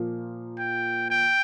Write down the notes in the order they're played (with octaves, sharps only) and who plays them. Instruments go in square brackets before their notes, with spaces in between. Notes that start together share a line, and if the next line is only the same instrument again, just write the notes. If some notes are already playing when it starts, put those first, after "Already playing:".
Already playing: [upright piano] A#2 F3 A#3
[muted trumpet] G5
G5